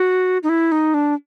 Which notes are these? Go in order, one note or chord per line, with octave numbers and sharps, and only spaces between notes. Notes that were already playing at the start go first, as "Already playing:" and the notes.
Already playing: F#4
D#4
E4
D#4
D4